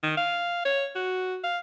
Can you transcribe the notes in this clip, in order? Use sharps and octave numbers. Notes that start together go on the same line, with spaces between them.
D#3
F5
C#5
F#4
F5